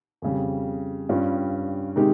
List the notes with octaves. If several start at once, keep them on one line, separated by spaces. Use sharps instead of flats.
F2 C#3 G3
G2 G3 C#4 F4
C3 D#3 G#3 D#4 G4